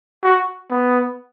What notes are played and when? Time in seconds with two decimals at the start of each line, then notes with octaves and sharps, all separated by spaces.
0.23 F#4
0.71 B3